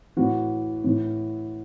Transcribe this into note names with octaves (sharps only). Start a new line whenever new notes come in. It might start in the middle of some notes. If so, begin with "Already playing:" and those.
A2 E3 F#4
A2 E3